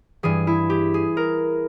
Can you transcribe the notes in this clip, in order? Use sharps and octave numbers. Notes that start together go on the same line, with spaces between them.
G2 E3 G#4
E4
G4
G#4
A#4